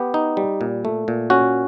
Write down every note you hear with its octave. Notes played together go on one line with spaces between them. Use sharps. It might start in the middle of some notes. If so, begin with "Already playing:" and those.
Already playing: B3 G4
D#4
G3
A#2
A3
A#2
C#4 F#4